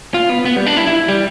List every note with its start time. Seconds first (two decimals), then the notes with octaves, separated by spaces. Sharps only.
0.14 F4
0.30 B3
0.45 B3
0.56 G3
0.66 D4
0.77 E4
0.87 E4
1.08 G3